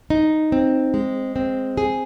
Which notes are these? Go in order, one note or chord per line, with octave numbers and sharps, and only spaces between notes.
D#4
C4
G#3
C4
G#4